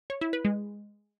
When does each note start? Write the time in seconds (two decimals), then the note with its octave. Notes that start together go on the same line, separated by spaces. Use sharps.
0.10 C#5
0.21 E4
0.33 B4
0.45 G#3